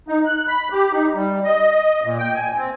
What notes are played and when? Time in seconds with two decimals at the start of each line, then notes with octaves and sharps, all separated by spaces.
0.08 D#4
0.25 F#6
0.48 B5
0.72 G4
0.93 D#4
1.15 G3
1.44 D#5
2.04 A#2
2.19 G5
2.34 G#5
2.58 C4